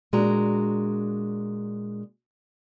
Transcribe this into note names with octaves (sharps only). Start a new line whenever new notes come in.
A#2 G#3 D4 F#4 A#5